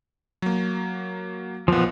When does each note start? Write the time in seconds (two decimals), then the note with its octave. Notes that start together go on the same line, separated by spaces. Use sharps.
0.42 F#3 A#3
1.68 B1 A#2 F3 B3